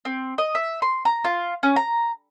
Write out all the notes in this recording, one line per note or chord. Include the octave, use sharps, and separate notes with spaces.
C4
D#5
E5
C6
A#5
F4
C#4
A#5